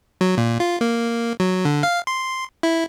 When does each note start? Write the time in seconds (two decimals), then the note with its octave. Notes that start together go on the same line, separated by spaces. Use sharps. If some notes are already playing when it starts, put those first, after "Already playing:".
0.21 F#3
0.38 A#2
0.60 F4
0.81 A#3
1.40 F#3
1.65 D3
1.83 F5
2.07 C6
2.63 E4